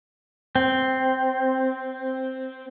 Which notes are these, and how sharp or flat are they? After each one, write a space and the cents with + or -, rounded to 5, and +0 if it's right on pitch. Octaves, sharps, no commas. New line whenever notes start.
C4 +0